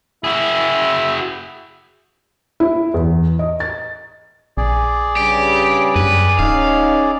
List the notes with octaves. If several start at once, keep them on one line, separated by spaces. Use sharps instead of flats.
E4 F#4 G#4
E4
E2
D#5
A6
A#1 G#4 D5
G2 C#3 G3 G4
F#2 B4
D1 C#4 D#4 F5